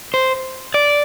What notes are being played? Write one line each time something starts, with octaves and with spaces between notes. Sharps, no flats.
C5
D5